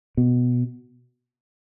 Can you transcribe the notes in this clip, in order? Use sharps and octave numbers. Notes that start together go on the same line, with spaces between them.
B2